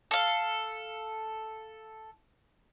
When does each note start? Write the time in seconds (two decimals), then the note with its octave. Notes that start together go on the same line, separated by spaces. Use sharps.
0.11 A4 F5